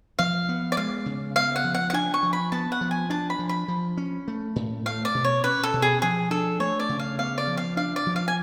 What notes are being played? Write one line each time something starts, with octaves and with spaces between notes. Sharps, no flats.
F3 F5
B3
D5
G#3 F5
C#3
B3 F5
F#5
F3
F#5
F#5
D4 G#5
C#6
F3
B5
B3 A5
F#5
F3
G#5
D4 A5
B5
F3
B5
F3
C#4
A3
A2
A3 F5
D5
B2
C#5
C#4 B4
A4
B2
G#4
F3 G#4
D4 A4
A3 C#5
D5
C#3
F5
B3 F5
D5
F3
F5
D4 F5
D5
F3
F5
G#5